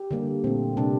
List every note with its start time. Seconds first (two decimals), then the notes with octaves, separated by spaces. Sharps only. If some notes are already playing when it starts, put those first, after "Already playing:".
Already playing: G4
0.11 D3 G3 A#3
0.44 A#2 A3 C4
0.77 C3 G3 A#3 D4